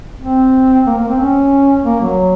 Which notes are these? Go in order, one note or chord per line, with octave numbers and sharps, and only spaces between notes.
C4
A#3
A#3
C4
C#4
A#3
F#3